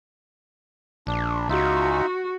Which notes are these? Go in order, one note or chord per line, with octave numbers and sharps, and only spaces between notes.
A#1 D4
C#2 D#4 F4 F#4 E5